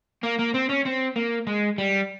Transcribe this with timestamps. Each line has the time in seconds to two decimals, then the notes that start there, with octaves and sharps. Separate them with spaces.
0.23 A#3
0.39 A#3
0.54 C4
0.69 C#4
0.85 C4
1.16 A#3
1.47 G#3
1.78 G3